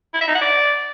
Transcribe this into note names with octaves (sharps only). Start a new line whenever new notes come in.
E4
E5
D#4
F#5
D5